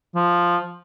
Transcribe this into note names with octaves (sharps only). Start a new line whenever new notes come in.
F3